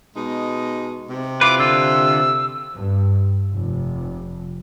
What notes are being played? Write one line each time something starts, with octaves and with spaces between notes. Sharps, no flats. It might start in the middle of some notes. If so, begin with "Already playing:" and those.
B2 G#3 D#4
C3
E4 F4 B4 D6
D3 F4 E6
G2
F1